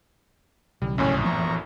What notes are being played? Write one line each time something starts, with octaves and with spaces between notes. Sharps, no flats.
B1 C#3 E3 G3
A#1 F#2 A2 C#4
E3 F3 B3 A#5 C#6